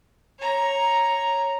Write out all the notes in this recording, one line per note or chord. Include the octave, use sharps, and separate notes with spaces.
C#5 A#5